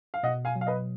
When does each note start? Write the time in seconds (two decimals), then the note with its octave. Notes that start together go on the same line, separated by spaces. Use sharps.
0.14 F5
0.23 B2 D#5 F#5
0.45 F5 G#5
0.56 F#3
0.61 F5
0.67 B4 D#5